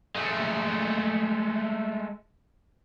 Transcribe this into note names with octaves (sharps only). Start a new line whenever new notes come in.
G#3 A3